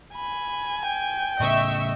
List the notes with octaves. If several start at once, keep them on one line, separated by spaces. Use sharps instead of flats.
G#5 B5
G5
A2 C#3 D#5 E5 C#6 E6